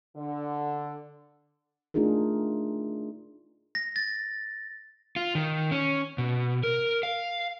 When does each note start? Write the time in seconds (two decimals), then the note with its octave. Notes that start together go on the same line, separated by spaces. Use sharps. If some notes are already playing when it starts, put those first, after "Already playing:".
0.16 D3
1.94 A3 D4 D#4 F4 G#4 A#4
3.75 A#6
3.96 A6
5.16 F4
5.35 D#3
5.71 C#4
6.18 B2
6.63 A#4
7.03 F5